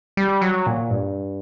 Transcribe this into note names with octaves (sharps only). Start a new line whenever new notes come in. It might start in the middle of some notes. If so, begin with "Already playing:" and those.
G3
F#3
A#2
G2